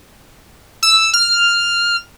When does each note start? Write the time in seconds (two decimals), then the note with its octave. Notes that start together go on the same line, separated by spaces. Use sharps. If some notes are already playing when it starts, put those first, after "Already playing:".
0.83 E6
1.13 F6